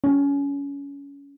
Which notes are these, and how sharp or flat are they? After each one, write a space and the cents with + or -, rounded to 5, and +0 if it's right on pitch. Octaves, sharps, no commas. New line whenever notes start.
C#4 +25